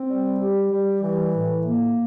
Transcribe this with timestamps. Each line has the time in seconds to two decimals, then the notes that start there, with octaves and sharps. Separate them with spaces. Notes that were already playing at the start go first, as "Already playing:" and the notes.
Already playing: C4
0.09 G3
0.40 G4
0.71 G3
1.03 E3
1.34 A2
1.65 A#3